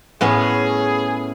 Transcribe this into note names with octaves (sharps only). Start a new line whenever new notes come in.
A2 B3 C#4 G#4